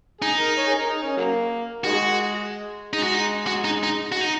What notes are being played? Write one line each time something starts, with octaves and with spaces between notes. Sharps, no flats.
D#4 G#4
A#4
C#5
G#4
A#4
D#4
C#4
C#3 F#3 A#3
D#3 G#3 F#4
G#3 D#4
F#4
D#4
F#4
D#4
D#4
F#4
D#4